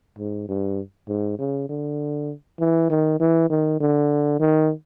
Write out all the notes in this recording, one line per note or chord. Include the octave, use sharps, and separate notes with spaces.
G#2
G2
G#2
C#3
D3
E3
D#3
E3
D#3
D3
D#3